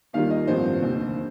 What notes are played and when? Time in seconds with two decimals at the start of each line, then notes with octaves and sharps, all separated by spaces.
0.13 D#2 D#3 G3 A#3 F4 F5
0.30 D#5
0.47 A1 G2 F3 C4 C5
0.82 F1 D#2 D3